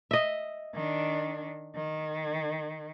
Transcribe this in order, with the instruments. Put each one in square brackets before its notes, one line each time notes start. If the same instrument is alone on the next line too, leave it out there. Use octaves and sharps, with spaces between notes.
[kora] D#5 E5
[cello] D#3 D4
D#3